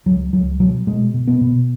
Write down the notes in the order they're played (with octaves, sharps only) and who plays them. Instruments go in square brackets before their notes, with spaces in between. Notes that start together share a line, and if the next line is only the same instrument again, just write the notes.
[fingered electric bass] C#2 F#3
C#2 F#3
B2 F#3
B2 G#3
B2
B3
B2